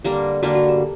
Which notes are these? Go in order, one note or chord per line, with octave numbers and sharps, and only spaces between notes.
D3 G3 A#3 G4
D3 G3 A#3 F#4
F#4
G4